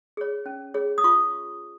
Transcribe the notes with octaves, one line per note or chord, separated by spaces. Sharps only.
G#4 C#5
C#4
G#4 C#5
D#6
F4 C#6